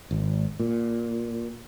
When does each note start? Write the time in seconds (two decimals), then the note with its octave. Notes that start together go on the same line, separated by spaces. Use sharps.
0.11 G#1
0.60 A#2